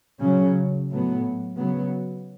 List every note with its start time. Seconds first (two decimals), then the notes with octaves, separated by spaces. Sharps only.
0.21 C#3 F#3 C#4
0.90 A2 F#3 B3
1.58 C#3 F#3 B3